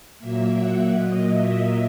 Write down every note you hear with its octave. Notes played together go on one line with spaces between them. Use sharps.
A#2 F#3 A#3 E5
F#5
A#2 F#3 A#3 D#5
E5